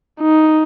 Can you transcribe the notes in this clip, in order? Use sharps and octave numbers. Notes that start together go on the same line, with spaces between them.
D#4